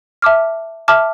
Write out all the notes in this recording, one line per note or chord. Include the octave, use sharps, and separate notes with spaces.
E5 A5 D6 F6
E5 A5 D6 F6